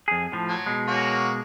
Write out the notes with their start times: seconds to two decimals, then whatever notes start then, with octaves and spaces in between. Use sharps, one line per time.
0.08 F2 G#4
0.32 A2 F3
0.49 F#3
0.66 B2 G#3
0.87 A#3 C#4 F#4